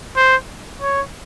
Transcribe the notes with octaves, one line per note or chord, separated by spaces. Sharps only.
C5
C#5